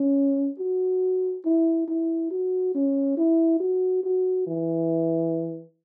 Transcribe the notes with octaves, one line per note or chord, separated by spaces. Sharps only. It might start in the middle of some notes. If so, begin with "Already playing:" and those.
Already playing: C#4
F#4
E4
E4
F#4
C#4
E4
F#4
F#4
E3